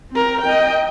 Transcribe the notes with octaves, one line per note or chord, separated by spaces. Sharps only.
C4 A#4
D#5 G5